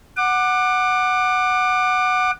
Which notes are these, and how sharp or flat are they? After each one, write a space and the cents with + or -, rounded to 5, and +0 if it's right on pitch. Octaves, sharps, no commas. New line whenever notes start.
F#5 +0 D6 +25